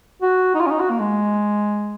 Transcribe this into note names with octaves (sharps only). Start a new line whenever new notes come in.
F#4
D#4
F4
C#4
D#4
F#4
A#3
G#3